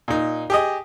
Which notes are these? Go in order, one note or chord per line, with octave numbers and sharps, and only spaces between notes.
A#2 D#4
G4 G#4 D#5